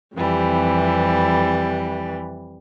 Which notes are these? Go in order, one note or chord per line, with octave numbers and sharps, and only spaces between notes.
F2 C3 E3 G3